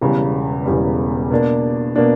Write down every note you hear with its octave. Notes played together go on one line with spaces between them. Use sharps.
E1 E2 C#3 G3
E1 E2 C#3 G3
B2 A#3 D4
B2 A#3 D4